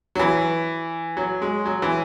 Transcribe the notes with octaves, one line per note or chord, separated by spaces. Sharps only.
F#3
E3
F#3
G#3
F#3
E3